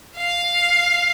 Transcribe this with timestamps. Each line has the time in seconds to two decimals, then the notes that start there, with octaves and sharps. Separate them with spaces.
0.16 F5